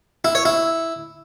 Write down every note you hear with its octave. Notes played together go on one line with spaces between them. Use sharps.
E4
C#5
E4